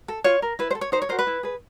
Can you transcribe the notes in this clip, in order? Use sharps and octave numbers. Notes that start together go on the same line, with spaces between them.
A4
F4 C#5
A#4
E4 B4
C5
A4
C#5
D#4 C5
C#5
F#4 A#4 C5
B4
E4
G#4 B4